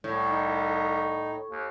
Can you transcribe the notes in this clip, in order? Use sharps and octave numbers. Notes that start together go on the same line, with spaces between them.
C2 A2
D#4
D#2